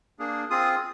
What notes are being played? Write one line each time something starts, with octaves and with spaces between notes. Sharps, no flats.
A#3 D4 G#4
C4 F4 G#4 D#6